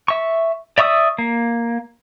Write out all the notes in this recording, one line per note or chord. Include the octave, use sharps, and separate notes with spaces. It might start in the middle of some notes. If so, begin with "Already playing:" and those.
E5 C#6
D5 E5 C#6 D#6 E6
A#3